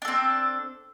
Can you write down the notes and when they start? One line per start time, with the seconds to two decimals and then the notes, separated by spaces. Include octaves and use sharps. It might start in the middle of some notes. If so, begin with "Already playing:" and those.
0.02 D4
0.05 A4
0.08 C4